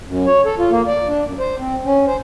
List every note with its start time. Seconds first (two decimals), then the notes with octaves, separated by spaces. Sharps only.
0.07 F#2
0.26 C#5
0.45 A4
0.59 F4
0.71 A#3
0.88 D5
1.08 D4
1.25 F#2
1.39 C5
1.59 C4
1.85 C#4
2.07 C5